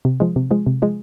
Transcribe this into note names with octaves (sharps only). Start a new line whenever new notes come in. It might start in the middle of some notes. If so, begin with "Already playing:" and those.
C3
F3 G#3
C3
F3 G#3
C3
F3 G#3